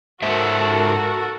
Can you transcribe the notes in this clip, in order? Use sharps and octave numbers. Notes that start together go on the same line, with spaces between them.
G#2 F#4 A4 A#4 C5 E5